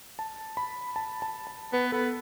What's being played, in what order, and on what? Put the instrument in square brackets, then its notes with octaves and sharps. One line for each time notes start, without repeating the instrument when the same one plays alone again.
[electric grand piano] A5
B5
A5
A5
A5
[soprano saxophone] B3 [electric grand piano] B4
[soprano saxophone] B3 [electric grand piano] A4